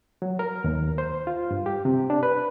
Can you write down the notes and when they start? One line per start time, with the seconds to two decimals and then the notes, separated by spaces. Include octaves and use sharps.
0.22 F#3
0.39 A#4
0.64 D#2
0.98 C5
1.27 F4
1.51 G2
1.66 G4
1.85 C3
2.10 D4
2.23 B4